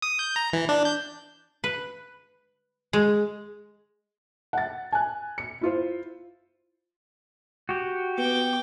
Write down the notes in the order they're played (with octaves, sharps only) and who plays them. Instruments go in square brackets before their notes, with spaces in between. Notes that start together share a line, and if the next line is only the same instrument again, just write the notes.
[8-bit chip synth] D#6
G6
A#5
E3
D4
G6
[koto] B4
G#3
[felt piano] F#5 A6
G#5 F#6
C#7
E4 F4 C5
[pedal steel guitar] F#4 G4
[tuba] B3 [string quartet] G5 D6